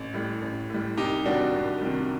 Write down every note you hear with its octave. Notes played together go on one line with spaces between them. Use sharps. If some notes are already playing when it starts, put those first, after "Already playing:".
Already playing: A1
A2 G3
A1
A2 G3
C2 D#4 G4
C3 D#3 G3 D4 F#4
C2
C3 D#3 G3